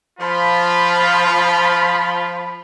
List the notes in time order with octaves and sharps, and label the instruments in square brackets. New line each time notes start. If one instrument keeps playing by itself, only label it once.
[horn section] F3 B5 [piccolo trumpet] F4